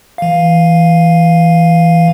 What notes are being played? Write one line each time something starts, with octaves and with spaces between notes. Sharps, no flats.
E3 F5